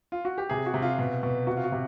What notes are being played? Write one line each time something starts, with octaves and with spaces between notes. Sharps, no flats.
F4
F#4
G4
C3 G#4
F#4
C3
F4
B2
B2
C3 F#4
F4
F#4
C3